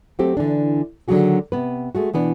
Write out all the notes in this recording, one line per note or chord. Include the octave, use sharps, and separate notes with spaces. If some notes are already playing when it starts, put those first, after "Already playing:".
F#3 A3 C4 G4 A4
D3 E3 D4
D3 D#3 F#3 A3 F#4 G#4
C3 B3 B4
G#3 A3 F#4
B2 E3 B3 D4